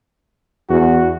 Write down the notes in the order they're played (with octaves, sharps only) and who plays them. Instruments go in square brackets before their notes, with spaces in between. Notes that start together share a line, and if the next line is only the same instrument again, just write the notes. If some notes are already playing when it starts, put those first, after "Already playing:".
[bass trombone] E2 [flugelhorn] F#4